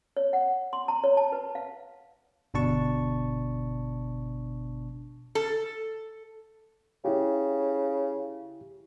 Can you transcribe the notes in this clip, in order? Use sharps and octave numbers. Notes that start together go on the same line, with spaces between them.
C#5
F#5
C6
A#5
C#5
A5
B4
F5
G1 B2 D4 A5 C#6
A4
C#3 E4 G4